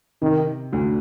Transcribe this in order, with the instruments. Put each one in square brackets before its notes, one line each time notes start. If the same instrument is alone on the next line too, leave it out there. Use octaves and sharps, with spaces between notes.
[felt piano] C3 [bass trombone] D#3
[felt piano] D2 D3